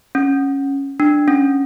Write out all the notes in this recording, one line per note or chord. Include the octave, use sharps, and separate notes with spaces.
C#4
D4
C#4